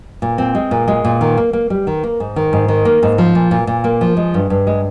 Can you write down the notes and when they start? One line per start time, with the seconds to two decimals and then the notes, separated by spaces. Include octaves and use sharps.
0.22 A#2
0.38 C4
0.55 G#3
0.71 A#2
0.88 G#3
1.04 A#2
1.21 D#3
1.37 A#3
1.53 A#3
1.70 G3
1.87 D#3
2.03 A#3
2.20 G#2
2.36 D#3
2.53 G#2
2.68 D#3
2.85 A#3
3.03 G#2
3.18 F3
3.35 A#2
3.51 A#2
3.67 A#2
3.84 A#3
4.01 F3
4.17 G#3
4.34 G2
4.50 G2
4.67 G#3